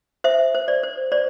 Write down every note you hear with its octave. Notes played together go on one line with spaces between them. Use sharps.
C5 E5
C5
D5
C5
C5 D5